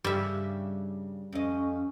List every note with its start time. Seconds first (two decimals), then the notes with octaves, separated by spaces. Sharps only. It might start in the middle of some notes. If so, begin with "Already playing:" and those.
0.04 G2 C#3 G3 E5
1.33 F2 C#4 D#5